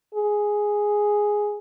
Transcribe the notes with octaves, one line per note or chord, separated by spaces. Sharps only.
G#4